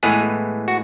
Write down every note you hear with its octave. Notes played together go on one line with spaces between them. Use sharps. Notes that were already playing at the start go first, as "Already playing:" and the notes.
A2 E3 G#3 B3 G#4
F#4